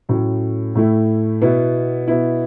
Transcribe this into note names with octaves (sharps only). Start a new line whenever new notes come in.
A2 F#3 A3 C#4
A2 A3 E4
B2 B3 E4
B2 B3 E4